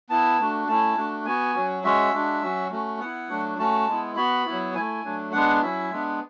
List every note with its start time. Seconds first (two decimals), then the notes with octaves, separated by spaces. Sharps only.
0.09 B3 E4 A5
0.39 A3 D4 F#4
0.68 A3 C#4 E4 A5
0.97 A3 D4 F#4
1.25 B3 F#4 G#5
1.55 F#3 C#4 F#4
1.84 G#3 C#4 F#4 E5
2.14 G#3 D4 F#4
2.42 F#3 C#4 F#4
2.71 A3 C#4 F#4
3.00 B3 E4 F#5
3.29 F#3 A3 D4 F#4
3.58 A3 C#4 F#4 A5
3.87 G#3 B3 E4
4.16 B3 F#4 B5
4.46 F#3 B3 E4
4.74 A3 E4 G#5
5.03 F#3 A3 D4
5.32 G#3 B3 D4 F#5
5.62 F#3 C#4 E4 E5
5.91 G#3 B3 D4